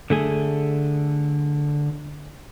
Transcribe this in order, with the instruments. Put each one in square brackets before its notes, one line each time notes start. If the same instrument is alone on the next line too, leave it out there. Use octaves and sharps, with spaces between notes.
[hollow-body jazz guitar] D3 A3 G#4